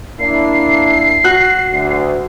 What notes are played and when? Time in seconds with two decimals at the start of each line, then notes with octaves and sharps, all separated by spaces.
0.20 A#3 D4 E4 C7
1.24 F#4 F#6
1.73 D2